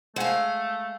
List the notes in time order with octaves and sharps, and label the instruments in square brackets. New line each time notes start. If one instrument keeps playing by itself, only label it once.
[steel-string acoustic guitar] G#3 F5 [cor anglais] A3 [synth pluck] C5 F#5 G#5